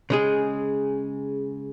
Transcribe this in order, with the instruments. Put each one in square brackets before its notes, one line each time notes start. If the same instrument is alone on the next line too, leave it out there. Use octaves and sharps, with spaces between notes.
[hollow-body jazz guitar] C#3 G#3 G#4